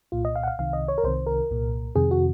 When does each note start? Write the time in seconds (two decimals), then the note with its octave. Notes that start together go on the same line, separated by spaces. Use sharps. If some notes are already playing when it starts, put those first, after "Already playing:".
0.12 C2 A#2 F4
0.25 D#5
0.35 F5
0.43 F#5
0.48 F5
0.59 C2 C3 D#3 F5
0.73 D#5
0.88 C#5
0.98 A#4
1.04 C2 C3 D#3 C5
1.27 A#4
1.51 C2 A#2
1.95 F2 C3 D#3 G#4
2.11 F#4